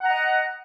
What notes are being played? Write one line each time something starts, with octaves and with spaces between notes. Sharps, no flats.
D#5 F#5 A#5